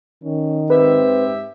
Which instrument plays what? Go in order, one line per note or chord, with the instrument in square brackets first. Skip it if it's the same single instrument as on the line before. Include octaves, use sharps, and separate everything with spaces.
[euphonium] D#3 [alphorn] C#4
[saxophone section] G#2 G4 E5 [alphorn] C4 [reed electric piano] B4